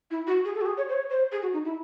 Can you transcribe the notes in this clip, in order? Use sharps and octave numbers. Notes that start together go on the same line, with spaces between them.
E4
F#4
G#4
A4
F#4
G#4
C#5
C5
C#5
C5
G#4
F#4
D#4
E4